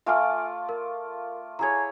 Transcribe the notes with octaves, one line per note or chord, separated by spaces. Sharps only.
A3 F4 D5 E5 G#5 F6
A#4
E4 G#4 C#5 A#5 G#6